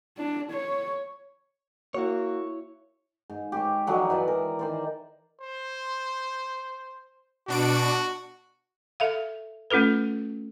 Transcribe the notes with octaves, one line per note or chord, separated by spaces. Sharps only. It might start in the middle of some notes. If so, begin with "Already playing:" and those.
D4
C#5
A#3 E4 F#4 C#5
G#2
G4 C5 C#5
D3 F3 F#3 G#3
E3 B4 D5
A#4
D#3 C5 D5
C5
B2 D4 F#4 D7
A4 E5 F5
A3 C#4 F4 A4 B4